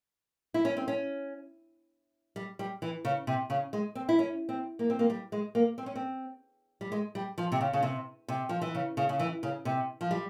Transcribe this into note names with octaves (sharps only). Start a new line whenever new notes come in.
E4
C#4
C4
C#4
G3
G3
E3
C#3
C3
C#3
G#3
C4
E4
C#4
C4
A#3
C4
A#3
G3
G#3
A#3
C4
C#4
C4
G3
G#3
G3
F3
C3
C#3
C#3
C3
C3
F3
E3
C#3
C#3
C#3
E3
C#3
C3
F3
G3